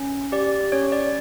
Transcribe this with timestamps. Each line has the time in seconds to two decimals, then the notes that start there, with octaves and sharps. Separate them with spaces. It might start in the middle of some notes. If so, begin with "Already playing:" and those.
Already playing: C#4
0.32 G4 D5
0.72 C#4 C#5
0.92 D5